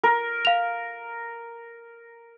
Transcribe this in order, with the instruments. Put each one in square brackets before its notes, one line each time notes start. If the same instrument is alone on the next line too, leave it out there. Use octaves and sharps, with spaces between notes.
[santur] A#4
[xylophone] F5 F7